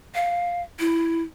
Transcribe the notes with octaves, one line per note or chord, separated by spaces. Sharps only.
F5
E4